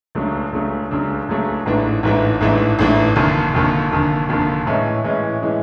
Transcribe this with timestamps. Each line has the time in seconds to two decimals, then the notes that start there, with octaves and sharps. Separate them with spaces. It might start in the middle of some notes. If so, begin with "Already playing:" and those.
0.15 C#2 C#3 F#3 A3 D4
0.53 C#2 C#3 F#3 A3 D4
0.91 C#2 C#3 F#3 A3 D4
1.28 C#2 C#3 F#3 A3 D4
1.66 A1 G#2 E3 A3 D4
2.03 A1 G#2 E3 A3 D4
2.41 A1 G#2 E3 A3 D4
2.79 A1 G#2 E3 A3 D4
3.16 F1 D#2 D3
3.54 F1 D#2 D3
3.92 F1 D#2 D3
4.29 F1 D#2 D3
4.67 A2 E3 G#3 C#4
5.04 A2 E3 G#3 C#4
5.42 A2 E3 G#3 C#4